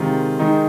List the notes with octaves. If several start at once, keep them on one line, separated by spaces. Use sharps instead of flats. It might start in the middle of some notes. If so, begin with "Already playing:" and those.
Already playing: C3 D#3 G#3 F4
D#3 G#3 D#4